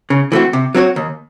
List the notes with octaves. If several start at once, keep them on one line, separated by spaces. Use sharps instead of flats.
C#3
E3 A3 C4 F#4
C3
F#3 C4 F#4 C#5
D#2